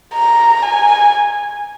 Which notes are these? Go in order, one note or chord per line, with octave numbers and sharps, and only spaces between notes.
A#5
G#5